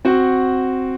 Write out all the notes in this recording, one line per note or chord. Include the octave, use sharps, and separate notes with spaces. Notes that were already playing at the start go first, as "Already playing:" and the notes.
C4 F#4 F#5